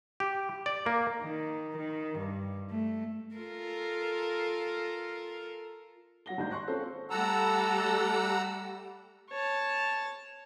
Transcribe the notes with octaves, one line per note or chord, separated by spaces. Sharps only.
G4
D5
A#3
D#3
D#3
G2
A3
F4 A4 A#4
F#3 F#5 A#6 G7
G#1 D#2 G#2 D4 G6
C6 C#6 F#6 A#6
C4 C#4 F4 G#4 A4 C5
G3 A3 A4 F#5 A#5 E6
C#5 A5